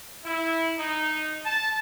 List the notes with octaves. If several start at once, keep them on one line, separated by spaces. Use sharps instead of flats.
E4
D#4
A5